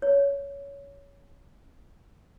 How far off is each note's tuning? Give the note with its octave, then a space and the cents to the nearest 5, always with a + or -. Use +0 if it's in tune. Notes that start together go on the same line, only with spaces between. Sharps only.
C#5 +15